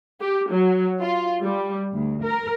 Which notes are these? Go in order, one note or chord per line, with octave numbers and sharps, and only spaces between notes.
G4
F#3
F4
G3
D2
A#4